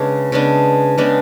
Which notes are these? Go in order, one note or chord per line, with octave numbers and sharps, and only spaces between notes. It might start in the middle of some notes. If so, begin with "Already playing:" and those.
Already playing: C#3 G#3 B3 D4
C#3 G#3 B3 D4
C#3 G#3 B3 D4